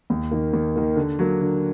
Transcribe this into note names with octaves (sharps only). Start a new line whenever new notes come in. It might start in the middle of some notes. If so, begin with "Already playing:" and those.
D#2
D#3 A#3
D#2
D#3 A#3
D3
F#3 A#3
D3